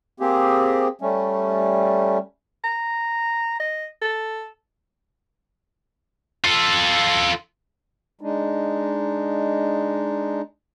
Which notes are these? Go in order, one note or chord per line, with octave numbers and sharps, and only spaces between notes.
A#3 C4 G4 G#4
G3 A3 C#4
A#5
D#5
A4
F4 A4
G#3 D4 D#4